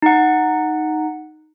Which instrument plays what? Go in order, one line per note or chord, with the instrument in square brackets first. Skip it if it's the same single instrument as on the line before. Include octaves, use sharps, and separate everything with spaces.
[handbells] D#4 F#5